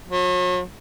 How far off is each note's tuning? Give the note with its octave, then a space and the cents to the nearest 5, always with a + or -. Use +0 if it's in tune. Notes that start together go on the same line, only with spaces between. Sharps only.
F#3 -40